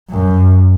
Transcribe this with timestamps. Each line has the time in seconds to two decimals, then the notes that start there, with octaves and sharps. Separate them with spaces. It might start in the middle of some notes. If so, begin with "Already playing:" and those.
0.11 F#2